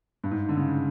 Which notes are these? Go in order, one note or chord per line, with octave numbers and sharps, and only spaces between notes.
G2
G#2
D3
C#3